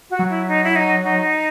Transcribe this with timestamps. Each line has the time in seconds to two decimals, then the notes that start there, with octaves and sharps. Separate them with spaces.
0.10 F#4
0.19 F#3
0.30 E4
0.48 D#4
0.64 E4
0.76 D#4
1.04 D#4